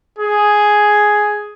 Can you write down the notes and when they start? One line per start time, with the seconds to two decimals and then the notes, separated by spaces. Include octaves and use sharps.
0.18 G#4